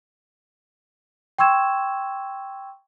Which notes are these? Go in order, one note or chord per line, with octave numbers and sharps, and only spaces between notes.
G5 C6 C#6 E6 G#6 E7